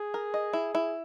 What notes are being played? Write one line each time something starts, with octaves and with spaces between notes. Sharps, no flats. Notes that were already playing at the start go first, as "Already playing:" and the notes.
Already playing: G#4
A#4
D#5
E4
E4